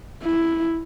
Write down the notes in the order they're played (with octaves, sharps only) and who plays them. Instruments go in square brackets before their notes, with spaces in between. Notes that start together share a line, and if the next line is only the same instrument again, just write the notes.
[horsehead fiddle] E4